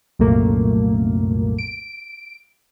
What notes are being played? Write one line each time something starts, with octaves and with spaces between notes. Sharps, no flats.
C2 F#2 A#2 A3 A#3
D7